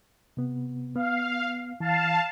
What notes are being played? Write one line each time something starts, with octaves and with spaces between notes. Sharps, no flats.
C3 B3
B3 F5
E3 F5 A5